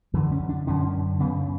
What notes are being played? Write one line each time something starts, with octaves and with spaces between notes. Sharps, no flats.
F#2 D3 E3
C#4
D4
F#2 D3 C#4
F#2 C#3 B3